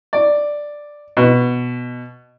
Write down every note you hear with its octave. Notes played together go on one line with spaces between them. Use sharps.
D5
B2